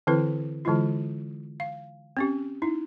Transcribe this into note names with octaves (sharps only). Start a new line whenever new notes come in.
D3 E3 C4 E4 B4
D3 E3 G#3 E4 F4
F5
C4 C#4 G4
D#4 E4